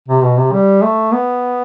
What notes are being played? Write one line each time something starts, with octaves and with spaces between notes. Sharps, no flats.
C3
B2
C3
G3
A3
B3